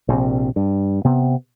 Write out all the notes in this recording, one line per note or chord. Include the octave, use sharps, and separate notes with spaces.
A#1 C3
G2
C3 B3